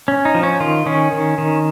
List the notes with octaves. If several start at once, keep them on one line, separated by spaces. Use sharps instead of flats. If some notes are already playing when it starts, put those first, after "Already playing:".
C#4
D#4
F3
C#4
D#3 F4
D#3 C#4
D#3
D#3